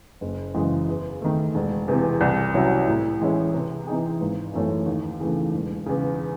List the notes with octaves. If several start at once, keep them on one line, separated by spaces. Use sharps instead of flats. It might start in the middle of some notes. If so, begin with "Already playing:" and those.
F#1
F#2 C#3 E3 G#3
E2
D#3 A3
E1
E2 C3 E3 C4
C2
C3 F#3 C#4 E4
A2
E3 G#3 C#4 E4
C3
E3 C4 D#4 G#4
G#1
F#2 E3 A3 C#4
D#2
C#3 E3 A3
E1
E2 C#3